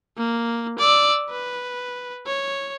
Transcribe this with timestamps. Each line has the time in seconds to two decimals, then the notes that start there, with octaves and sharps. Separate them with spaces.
0.18 A#3
0.79 D5 E6
1.30 B4
2.26 C#5